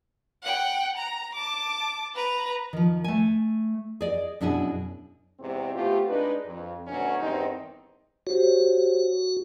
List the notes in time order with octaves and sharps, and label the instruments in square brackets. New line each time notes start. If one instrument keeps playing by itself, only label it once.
[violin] F#5 G5
A#5
A5 D6
B4 A#5
[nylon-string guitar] D#3 F3
A3 G#5
G#4 D5 D#5
F#2 B2 D4 E4 G#4
[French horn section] E2 G#2 C3 C4
B2 A3 C4 F4 G4
G#3 D4 D#4 B4
F2
D2 B2 F#3 C#4
E2 G2 D#3 C4 D#4
[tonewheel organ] F#4 [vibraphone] G4 C5 C#5